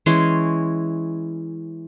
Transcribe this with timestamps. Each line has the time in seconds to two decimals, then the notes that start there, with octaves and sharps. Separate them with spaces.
0.06 E3 G#3 C#4 C6